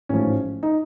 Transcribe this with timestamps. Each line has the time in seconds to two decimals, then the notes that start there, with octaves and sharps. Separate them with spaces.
0.09 A1 G#2 F3 C#4
0.63 D#4